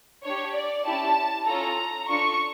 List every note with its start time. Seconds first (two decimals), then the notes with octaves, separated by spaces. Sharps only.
0.24 D4 G4 C#5
0.56 D5
0.86 C#4 E4 G4 A5
1.47 C#4 F4 A4 A#5
2.09 D4 F4 A4 C#6